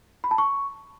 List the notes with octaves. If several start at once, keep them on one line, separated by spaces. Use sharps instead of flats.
B5
A5
C#6